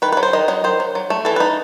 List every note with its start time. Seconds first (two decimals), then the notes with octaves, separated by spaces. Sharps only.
0.02 D#3 B4
0.12 F#3 B4
0.23 C5
0.33 D#3 D#5
0.48 F#3 D#5
0.64 D#3 C5
0.80 F#3
0.95 F#3
1.10 A3
1.25 E3 A4
1.36 D#4 B4